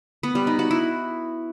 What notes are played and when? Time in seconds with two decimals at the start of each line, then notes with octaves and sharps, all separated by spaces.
0.23 B3
0.35 G3
0.47 D#4
0.59 F#4
0.71 E4